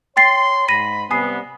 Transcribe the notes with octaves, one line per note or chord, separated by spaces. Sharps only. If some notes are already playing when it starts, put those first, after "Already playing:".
C#5 G5 C6 A6 C7
G#2 B5 A#6 D#7
C3 G3 B3 G#5 D#6 C7